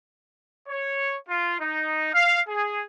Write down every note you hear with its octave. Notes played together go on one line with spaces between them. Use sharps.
C#5
F4
D#4
F5
G#4